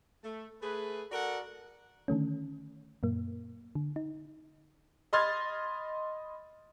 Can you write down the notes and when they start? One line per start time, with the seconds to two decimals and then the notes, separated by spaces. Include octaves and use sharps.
0.23 A3
0.62 A3 G#4 B4
1.11 F#4 A4 A#4 D5 F#5
2.08 D3 D#3 A3 C#4
3.03 F#2 A#2 A#3
3.75 D3
3.96 D#4
5.13 D#5 B5 C6 F6 G#6 A6